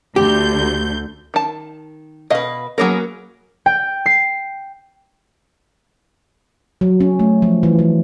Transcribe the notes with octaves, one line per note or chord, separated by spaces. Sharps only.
D2 G4 G6
D#3 A5
B2 B4 D#5 F5
F#3 A#3 B3 C#4 G#4 A#4
G5
C7
F#3
C#4
A3
F3
E3
E3